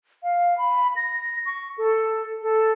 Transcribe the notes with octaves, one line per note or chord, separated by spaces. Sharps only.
F5
B5
A#6
C#6
A4
A4